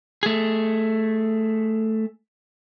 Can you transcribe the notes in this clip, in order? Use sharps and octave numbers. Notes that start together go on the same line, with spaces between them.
A3 G#4